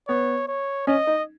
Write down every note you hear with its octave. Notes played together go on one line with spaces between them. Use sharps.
B3 C#5
C#5
C#4 D#5
D#4